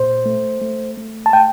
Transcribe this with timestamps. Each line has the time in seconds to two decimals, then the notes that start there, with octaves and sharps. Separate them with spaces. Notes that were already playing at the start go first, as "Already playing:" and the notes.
Already playing: A#2 C5
0.26 A3
0.61 A3
0.97 A3
1.26 A5
1.33 A3 G5